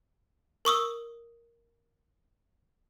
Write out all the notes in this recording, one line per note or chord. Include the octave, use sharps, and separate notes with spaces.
A#4 C#6 D#6 E6